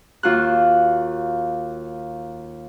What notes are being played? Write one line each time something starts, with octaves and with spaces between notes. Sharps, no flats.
D#2 F4 F#4 F#6